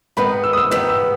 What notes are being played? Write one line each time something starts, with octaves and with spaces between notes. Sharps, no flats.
G#2 D#3 G#3 B3 B5
E6
D#6
E6
G#2 D#3 G#3 B3 E6
E6